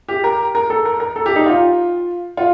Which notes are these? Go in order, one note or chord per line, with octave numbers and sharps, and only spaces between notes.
G4
A#4
A#4
A4
A#4
A#4
A4
G4
D#4
F4
F4